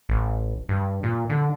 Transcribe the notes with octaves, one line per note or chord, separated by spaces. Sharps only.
A1
G2
A#2
D3